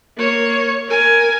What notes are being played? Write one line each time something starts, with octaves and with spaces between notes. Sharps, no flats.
A#3 C#5
A#4 G#5